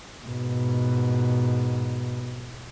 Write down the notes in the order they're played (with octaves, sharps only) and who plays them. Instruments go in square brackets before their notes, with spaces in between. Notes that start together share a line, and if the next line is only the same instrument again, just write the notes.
[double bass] G#2 B2